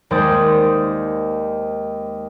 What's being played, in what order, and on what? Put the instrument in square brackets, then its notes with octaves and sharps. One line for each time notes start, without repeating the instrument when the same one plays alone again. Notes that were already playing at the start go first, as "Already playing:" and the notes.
[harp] D#2 G#3 C5 D5 D#6